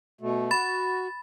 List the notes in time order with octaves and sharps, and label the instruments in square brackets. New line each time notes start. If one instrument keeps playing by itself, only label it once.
[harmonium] B2 A3
[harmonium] F#4 [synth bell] B5 A6